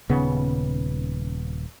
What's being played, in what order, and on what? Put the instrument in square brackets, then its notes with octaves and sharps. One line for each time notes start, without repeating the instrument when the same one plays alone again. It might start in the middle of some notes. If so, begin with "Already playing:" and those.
[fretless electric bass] D#1 C#3 B3